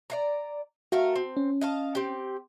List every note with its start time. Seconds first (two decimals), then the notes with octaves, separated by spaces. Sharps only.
0.10 D5 F5 A#5
0.92 A3 F#4 A#4 F5
1.16 C4
1.37 C#4
1.61 D#5 F5 A5
1.95 C4 G4